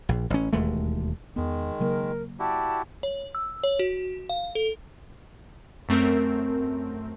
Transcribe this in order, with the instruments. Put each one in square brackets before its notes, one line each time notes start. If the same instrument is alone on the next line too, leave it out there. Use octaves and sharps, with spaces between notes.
[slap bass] A#1
A1 C#4
E1 D#2 G#3 A3
[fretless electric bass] E2 B3 [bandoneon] D#3 G#3
[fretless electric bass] C#3 F#3 A#3 [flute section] A#4
[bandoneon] E4 F#4 G4 [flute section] D5 A5
[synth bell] C#5
E6
C#5
F#4
F5
A4
[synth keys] F#2 A3 C4 A#4